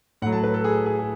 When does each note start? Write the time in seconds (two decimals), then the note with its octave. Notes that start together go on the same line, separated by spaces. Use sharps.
0.22 A2 F#5
0.26 F#3
0.32 A5
0.43 B4
0.54 A4
0.64 G#4
0.86 G#4
0.99 G#4